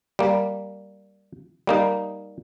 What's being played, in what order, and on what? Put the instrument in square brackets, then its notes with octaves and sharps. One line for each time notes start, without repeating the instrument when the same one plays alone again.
[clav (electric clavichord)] G3 A#3
G3 A#3 D#4